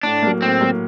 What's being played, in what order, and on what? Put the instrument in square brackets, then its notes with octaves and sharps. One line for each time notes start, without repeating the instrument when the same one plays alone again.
[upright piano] A2 [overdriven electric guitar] D4
[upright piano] F#3 A#3
[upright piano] A2 [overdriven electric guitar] C4
[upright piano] F#3 A#3